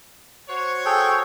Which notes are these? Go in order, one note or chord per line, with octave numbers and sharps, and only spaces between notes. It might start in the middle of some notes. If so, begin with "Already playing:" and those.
F#4 C5 C#5
G#4 A4 G5